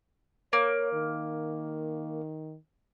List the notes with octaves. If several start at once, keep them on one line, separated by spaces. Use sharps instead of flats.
A#3 C#5
D#3